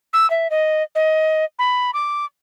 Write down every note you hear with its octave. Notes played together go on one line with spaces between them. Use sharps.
E6
E5
D#5
D#5
B5
D6